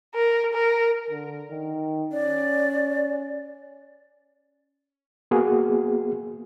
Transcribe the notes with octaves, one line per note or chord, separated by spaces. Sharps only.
A#4
A#4
D3
D#3
C#4 D5
A#3 B3 F#4 G#4